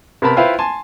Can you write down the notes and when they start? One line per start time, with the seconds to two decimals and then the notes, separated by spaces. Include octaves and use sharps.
0.22 C3 B3 A#4 A5 B5
0.37 E4 F4 B4 C5 F5 G5
0.59 G#5 A5 C6